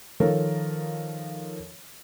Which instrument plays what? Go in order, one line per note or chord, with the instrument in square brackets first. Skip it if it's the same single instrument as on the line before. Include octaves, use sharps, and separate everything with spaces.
[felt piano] D#3 F3 A4 A#4 C#5